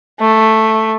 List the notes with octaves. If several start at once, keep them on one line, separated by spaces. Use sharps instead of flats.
A3